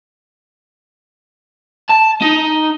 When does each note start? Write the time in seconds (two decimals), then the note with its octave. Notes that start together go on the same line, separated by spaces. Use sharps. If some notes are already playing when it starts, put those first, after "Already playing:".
1.90 A5
2.22 D#4